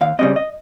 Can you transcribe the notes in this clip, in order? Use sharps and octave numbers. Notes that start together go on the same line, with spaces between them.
D#2 F5
C#3 G3 C4 D#5
D#5